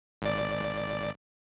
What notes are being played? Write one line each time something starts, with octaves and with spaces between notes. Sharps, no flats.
G#1 D5